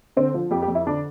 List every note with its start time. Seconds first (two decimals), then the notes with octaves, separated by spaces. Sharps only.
0.17 D3 C4
0.34 F3
0.51 F2 G4
0.62 G4
0.68 F2
0.75 E4
0.87 D3 D4